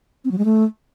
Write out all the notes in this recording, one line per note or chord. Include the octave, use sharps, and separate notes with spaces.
C4
F#3
G#3
A3